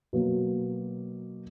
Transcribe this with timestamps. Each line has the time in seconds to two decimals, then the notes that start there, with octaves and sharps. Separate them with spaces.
0.13 B2 F#3 A#3